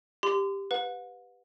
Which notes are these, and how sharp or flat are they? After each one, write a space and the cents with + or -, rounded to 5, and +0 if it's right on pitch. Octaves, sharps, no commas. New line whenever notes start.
G4 +10 C6 -35
B4 +10 F#5 -45